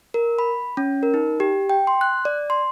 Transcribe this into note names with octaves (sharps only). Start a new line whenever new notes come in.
A#4
B5
C#4
A#4
D#4
G4
G5
C6
F#6
D5
C6